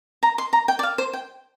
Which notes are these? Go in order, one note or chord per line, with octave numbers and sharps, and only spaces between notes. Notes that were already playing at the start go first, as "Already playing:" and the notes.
A#5
C6
A#5
G5
D5
F5
C5
G5